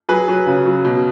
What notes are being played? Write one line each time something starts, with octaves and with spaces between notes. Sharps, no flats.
F#3 G#4 B4
F#3
C#3
F#3
B2